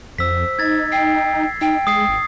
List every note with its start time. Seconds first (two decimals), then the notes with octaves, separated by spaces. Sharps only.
0.18 F2 C5 E6 B6
0.59 D#4 G#6 A6
0.92 G5 C7
1.61 D#4 G5
1.87 G#3 D#6 C7
2.09 G#1